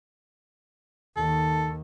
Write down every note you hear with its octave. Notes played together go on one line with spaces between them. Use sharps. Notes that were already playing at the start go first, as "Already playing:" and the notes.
D#2 D#3 A4